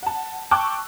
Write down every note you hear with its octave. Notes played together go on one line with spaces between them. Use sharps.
F#5 A5
G5 A5 C#6 D6 E6 F#6